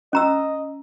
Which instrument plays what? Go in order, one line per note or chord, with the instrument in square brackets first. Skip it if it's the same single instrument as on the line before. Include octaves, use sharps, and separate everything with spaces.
[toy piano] C#4 A#5 E6 [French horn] D#5